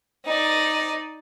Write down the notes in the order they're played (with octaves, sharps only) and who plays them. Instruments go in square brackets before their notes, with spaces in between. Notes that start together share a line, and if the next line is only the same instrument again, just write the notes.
[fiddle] D#4 D5